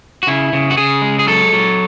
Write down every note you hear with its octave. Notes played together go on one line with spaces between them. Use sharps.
F#4
C#3 E4
C#3
F#4
C#3 G#4
G#3
G#4
F#3 A4
F#3